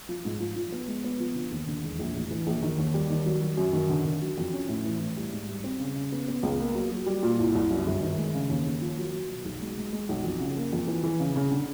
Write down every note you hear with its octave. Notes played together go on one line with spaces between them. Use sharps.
F3
G#2
F3
F3
B3
G#3
B3
F3
D3
D#2
D3
E1
A#1
A2
E3
A#1
D#3
D#2
G3
D#3
F#3
F#3
F#2
D#3
D3
D3
F#3
F2
C#4
A2
E3
A2
G3
G#2
G3
C4
C#3
C#3
B3
B3
C#2
A#3
F#3
F#3
G3
A#2
C2
C2
F#2
G1
D#3
G#3
C#3
D#2
D#2
F3
F#3
F#3
B2
B1
G#3
G#3
G#3
B1
F2
C#3
A#3
F2
E3
E3
C#3
C#3
D3